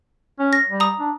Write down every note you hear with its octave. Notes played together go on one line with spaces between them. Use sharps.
C#4
A#6
G3
A#5 D#6
D4